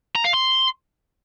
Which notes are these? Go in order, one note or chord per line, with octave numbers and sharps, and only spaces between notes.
A#5
F5
C6